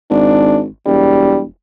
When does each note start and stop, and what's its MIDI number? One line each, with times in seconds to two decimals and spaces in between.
0.10 0.68 32
0.10 0.60 62
0.86 1.47 28
0.86 1.39 55